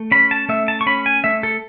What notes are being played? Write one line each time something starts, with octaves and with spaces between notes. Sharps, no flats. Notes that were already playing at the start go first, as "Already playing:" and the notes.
Already playing: A3
C#4 B5
A5
A3 E5
A5
C#6
C#4 B5
G#5
A3 E5
A4